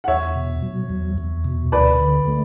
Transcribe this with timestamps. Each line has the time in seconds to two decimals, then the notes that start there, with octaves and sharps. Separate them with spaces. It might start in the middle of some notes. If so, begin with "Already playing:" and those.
0.04 F#5
0.08 E2 C#5 E5
0.35 B2
0.63 F#3
0.90 E2
1.18 E2
1.44 B2
1.72 D2 B4 D5
2.00 D3
2.28 A3